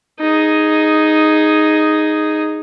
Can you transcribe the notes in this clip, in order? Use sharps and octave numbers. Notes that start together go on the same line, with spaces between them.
D#4 G#4